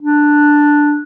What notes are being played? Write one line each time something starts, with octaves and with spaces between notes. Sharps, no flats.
D4